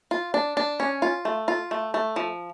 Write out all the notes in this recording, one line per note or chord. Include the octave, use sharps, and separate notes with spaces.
F4
D4
D4
C#4
F4
A3
F4
A3
A3
F3